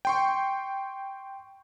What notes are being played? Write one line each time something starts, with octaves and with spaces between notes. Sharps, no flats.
G5 C6 C#6